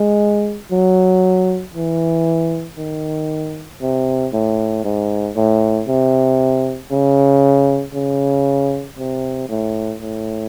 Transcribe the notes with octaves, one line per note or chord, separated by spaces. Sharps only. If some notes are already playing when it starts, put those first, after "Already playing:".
Already playing: G#3
F#3
E3
D#3
C3
A2
G#2
A2
C3
C#3
C#3
C3
A2
A2